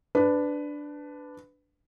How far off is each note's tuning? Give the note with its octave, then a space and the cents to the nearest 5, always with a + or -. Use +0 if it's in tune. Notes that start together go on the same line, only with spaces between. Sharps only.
D4 +0 B4 +15